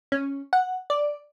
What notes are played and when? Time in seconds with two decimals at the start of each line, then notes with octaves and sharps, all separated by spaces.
0.12 C#4
0.53 F#5
0.90 D5